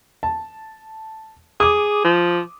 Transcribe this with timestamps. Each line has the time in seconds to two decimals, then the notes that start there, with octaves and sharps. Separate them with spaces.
0.23 A5
1.60 G#4 D6 D#6
2.04 F3